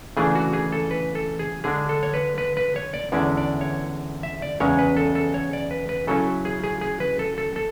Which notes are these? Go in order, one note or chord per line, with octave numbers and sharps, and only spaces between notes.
C#3 E3 A3 D4 G#4
F#4
G#4
A4
B4
A4
G#4
D3 G#3 D4 G#4
A4
C#5
B4
B4
B4
C#5
D5
E2 D3 G#3 C#4 E4 D5
D5
C#5
E5
D5
E2 C#3 G#3 C#4 C#5
B4
A4
A4
C#5
D5
B4
B4
C#3 F#3 C#4 E4 A4
G#4
G#4
G#4
B4
A4
A4
A4